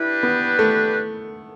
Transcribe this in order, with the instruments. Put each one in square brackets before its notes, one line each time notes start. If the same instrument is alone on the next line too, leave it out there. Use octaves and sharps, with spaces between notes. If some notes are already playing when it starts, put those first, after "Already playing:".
Already playing: [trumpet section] D4 G4 B4 [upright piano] E4
[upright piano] B3
A3